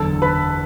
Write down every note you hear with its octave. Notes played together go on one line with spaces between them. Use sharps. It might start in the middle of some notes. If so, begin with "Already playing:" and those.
Already playing: F#1 E2 D3 A4 A5
B4 B5